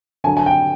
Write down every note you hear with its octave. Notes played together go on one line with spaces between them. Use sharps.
D3 F#3 G#5
G#5
G5